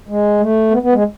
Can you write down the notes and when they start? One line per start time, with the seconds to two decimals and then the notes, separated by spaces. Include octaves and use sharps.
0.08 G#3
0.40 A3
0.71 B3
0.82 B3
0.92 G#3